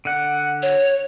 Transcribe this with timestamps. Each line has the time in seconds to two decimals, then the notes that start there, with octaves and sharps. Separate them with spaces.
0.05 D3 F#5
0.62 C#5